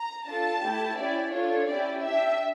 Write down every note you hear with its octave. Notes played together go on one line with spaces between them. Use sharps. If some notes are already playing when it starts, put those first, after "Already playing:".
Already playing: A#5
D4 F4 A4 A5
A3 E4 G4
C#4 E4 G4 D5
D4 F4 A4 C#5
C#4 E4 G4 D5
D4 G4 E5